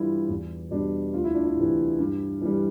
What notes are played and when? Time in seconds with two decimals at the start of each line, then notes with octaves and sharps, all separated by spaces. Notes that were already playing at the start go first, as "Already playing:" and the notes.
Already playing: G2 E3 G3 E4 F4
0.29 E2
0.71 B2 G3 D4
1.14 D2 F4
1.24 E4
1.34 D4
1.45 E4
1.56 C3 E3
1.99 G2
2.41 E3 G3